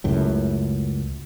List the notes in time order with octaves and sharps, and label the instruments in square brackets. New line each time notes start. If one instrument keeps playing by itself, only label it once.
[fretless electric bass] C#2 F#2 A2